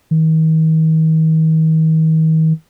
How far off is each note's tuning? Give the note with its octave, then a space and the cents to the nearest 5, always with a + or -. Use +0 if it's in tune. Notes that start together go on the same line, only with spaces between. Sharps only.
D#3 +40